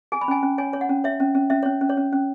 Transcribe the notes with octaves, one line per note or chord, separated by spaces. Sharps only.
G#4 G#5
B5
C#4 G#5
C#4
C#5 G#5
C#5
F#5
C#4
C#5 E5
C#4
C#4
C#4 E5
C#4 C#5
C#4
C#5
C#4
C#4